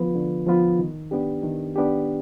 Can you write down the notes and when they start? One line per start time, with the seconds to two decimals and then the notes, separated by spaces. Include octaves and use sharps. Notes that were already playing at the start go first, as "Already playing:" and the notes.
Already playing: D3 F3 B3 F4 B4
0.15 D3
0.47 F3 B3 F4 B4
0.79 D#3
1.11 B3 D4 G4
1.43 D#3
1.76 B3 D4 G4